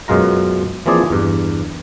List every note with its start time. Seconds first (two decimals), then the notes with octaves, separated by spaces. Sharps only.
0.08 F#2 B2 G#3 F4 A#5
0.86 E3 F3 A#3 C4 G#4 D5
1.10 E2 G2